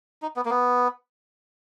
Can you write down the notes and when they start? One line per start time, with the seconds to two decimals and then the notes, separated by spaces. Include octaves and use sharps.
0.22 D#4
0.36 B3
0.45 A#3
0.50 B3